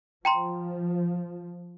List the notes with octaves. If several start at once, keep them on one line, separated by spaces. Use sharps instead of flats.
F3 G5 A#5 C6